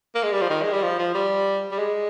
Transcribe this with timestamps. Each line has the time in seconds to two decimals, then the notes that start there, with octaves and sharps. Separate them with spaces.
0.15 A#3
0.23 G#3
0.33 G3
0.41 F3
0.50 D#3
0.63 G#3
0.73 G3
0.82 F3
0.99 F3
1.15 G3
1.72 G3
1.78 G#3